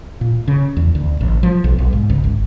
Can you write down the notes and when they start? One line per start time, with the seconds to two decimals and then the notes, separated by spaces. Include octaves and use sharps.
0.21 A#2
0.48 C#3
0.77 E2
0.95 D2
1.21 A1
1.43 F3
1.64 B1
1.78 B1
1.93 G#2
2.10 C#2
2.24 G#1